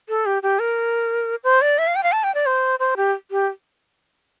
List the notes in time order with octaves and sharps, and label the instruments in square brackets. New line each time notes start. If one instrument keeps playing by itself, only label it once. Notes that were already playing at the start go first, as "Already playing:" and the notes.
[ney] A4
G4
G4
A#4
C5
D5
E5
F5
G5
F5
A5
G5
D5
C5
C5
G4
G4